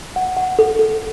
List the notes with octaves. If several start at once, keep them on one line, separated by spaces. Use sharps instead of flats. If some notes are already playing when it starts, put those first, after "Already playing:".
F#5
F#5
A4
A4